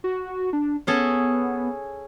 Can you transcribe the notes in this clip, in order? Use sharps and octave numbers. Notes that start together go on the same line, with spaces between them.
F#4
D4
B3 C#4 G#4 A4